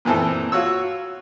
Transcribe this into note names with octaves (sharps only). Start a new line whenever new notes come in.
A#2 D#3 E3 C4 A4
F4 F#4 C#5 E6